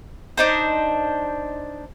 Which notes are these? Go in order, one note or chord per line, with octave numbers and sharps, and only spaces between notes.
D4 D#4 C5